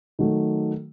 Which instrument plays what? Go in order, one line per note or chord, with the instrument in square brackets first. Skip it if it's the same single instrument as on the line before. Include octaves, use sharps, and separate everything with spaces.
[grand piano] D#3 F#3 A3